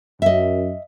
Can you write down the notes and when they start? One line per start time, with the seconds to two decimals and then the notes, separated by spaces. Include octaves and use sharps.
0.22 F#2 D#5 E5